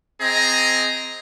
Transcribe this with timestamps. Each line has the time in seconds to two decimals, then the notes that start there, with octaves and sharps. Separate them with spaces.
0.21 C4 G#4 D#5 A#5